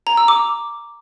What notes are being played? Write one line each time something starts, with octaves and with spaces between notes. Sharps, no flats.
A#5
E6
D6